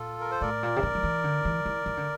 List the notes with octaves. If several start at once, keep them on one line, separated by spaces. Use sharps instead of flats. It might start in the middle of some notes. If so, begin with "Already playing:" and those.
Already playing: A#2 F4 A4
A#4
C5
A2 A#4 D5
A#2
C3
D3
F3
E3
D3
E3
E3
E3
D3